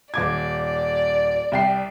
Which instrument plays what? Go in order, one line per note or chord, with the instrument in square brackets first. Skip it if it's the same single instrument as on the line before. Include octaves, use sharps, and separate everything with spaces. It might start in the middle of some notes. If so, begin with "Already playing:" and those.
[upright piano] D#1 D6 G#6 [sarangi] D5
[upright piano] C2 G5 C7